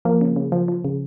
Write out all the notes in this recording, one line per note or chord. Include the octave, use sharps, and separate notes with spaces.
F3 A#3
C#3
C#3
F3
F3
C#3